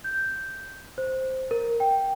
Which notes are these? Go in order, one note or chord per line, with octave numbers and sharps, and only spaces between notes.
G6
C5
A#4
G5